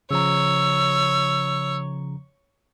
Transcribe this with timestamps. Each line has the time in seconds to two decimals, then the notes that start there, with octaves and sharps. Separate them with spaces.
0.11 C#3 F3 C#5 A#5 E6